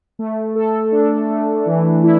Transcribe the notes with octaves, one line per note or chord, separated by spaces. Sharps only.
A3
A4
D4
A3
E3
E4